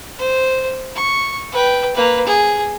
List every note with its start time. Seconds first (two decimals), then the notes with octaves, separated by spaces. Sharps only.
0.19 C5
0.95 C#6
1.52 B4 G5
1.95 A#3 B4
2.27 G#4